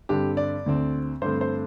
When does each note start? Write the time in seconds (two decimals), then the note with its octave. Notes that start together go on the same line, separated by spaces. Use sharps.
0.09 G2 D3 C4 G4
0.37 D5
0.66 D2 D3 C4
1.22 G2 D3 A3 C4 C5
1.41 C5